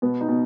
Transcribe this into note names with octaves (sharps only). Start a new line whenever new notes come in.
B2 B3
D#4
B2